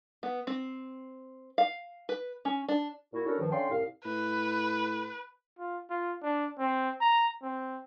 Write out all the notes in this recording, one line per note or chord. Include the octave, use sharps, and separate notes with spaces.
B3
C4
F5
B4
C#4
D4
A#2 E4 F#4
C#4 D4 E4 F#4 A4 A#4
G2 D#3 F3
D3 C#4 D5 F5 G5 C6
C2 A2 F5
A2 B4
F4
F4
D4
C4
A#5
C4